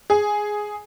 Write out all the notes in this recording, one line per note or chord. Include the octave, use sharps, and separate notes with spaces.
G#4